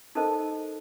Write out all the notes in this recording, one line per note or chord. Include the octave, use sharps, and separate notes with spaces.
D#4 A4 A#4 C5 D#5 A5